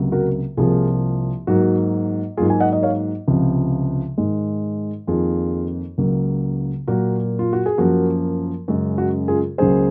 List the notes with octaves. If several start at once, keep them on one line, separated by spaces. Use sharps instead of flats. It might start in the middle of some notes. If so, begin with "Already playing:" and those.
Already playing: C#2 C3 F#3 A#3
F#4 A#4
C2 C3 F3 A#3 F4 G#4
G#2 F#3 A#3 F#4
G#2 F#3 A#3 F4 G#4
G#5
D#5 F#5
D#5
C#5 F5
C#2 C3 F3
G#2 D#3 G#3
F2 D#3 A#3 F4 G#4
C#2 C#3 F#3 A#3
A#2 F#3 A#3 F#4 A#4
F4
F#4
G#4
F#2 F3 A#3 F#4 A#4
F#2 C#3 G#3
F#4
F4 G#4
C#2 C#3 F#3 A#3 G#4 C5